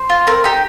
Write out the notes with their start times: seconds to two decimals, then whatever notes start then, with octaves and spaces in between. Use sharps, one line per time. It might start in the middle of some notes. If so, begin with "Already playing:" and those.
Already playing: C5
0.09 F4
0.27 C4 A#4
0.44 D#4 G4